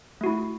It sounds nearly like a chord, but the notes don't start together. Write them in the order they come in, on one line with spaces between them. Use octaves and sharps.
A3 F#4 E4